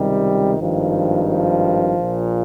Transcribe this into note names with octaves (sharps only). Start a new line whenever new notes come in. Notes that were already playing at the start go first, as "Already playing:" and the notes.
Already playing: C#2 C3 D#3 G3
G#1 G2 D#3 F3
F3
A#1 A#2